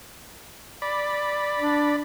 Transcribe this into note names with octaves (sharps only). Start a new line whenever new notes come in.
D5 B5
D4